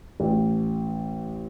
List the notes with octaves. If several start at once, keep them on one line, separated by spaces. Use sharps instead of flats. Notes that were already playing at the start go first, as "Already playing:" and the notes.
A1